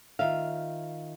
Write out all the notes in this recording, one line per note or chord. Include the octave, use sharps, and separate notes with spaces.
D#3 F4 E5 F5